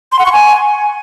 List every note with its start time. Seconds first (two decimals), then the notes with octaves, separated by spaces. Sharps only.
0.12 C6
0.19 F#5
0.26 C#6
0.32 G#5